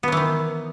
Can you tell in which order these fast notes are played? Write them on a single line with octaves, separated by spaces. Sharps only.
B3 F#3 E3 D#3